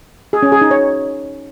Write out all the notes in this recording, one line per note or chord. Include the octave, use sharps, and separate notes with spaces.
G#4
C#4
G#4
D#4
C#5